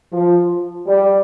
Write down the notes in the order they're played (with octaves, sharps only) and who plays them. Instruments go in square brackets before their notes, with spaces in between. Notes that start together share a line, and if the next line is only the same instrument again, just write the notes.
[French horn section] F3
G3